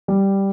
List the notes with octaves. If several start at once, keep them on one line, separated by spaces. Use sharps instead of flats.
G3